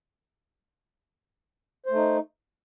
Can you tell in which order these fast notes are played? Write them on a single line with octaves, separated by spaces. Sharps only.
C5 A3 D#4